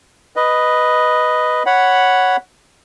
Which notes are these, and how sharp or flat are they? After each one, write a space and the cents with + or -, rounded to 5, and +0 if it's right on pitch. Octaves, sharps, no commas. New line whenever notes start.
B4 +0 D#5 +0
C#5 +0 F#5 +0 B5 +0